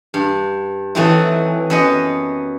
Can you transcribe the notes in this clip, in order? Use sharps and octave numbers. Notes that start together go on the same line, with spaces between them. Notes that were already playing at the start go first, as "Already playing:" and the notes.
G2
E3 F#3 A3 C4 D#4 E4
F#2 B3 D#5